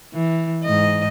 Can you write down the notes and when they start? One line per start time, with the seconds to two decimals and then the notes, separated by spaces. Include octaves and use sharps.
0.13 E3
0.64 G#2 D#5